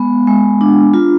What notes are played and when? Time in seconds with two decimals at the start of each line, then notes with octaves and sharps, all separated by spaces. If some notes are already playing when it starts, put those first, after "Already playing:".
Already playing: G#3 B3
0.27 G#3
0.61 D4
0.94 F4